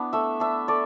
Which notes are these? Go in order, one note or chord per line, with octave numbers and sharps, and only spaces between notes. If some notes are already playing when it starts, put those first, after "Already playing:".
Already playing: B3 D4 E4
A3 E5
D4 E5
A3 D5